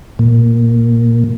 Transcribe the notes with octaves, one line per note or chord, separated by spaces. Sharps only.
A#2